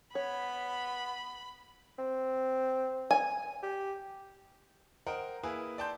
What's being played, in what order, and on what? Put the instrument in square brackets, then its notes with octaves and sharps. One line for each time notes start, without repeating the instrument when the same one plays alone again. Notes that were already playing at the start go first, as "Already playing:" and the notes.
[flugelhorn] B3 [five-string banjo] C#5 [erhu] B5
[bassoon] C4
[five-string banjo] G#5
[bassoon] G4
[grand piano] A#4 C5 D#5 F#5 G5
A#3 E4 G#4 B4
D5 G5 A5 C6 G6